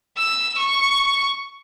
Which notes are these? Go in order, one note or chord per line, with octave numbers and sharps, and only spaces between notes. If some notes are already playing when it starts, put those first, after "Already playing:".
E6
C#6